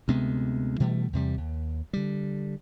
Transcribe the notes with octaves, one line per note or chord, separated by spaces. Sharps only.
D2 C3 G#3 B3
B2 E3 G3 A3
E2 C3 G3
D#2
D3 G3